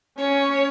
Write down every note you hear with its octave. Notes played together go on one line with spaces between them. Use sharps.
C#4 C#5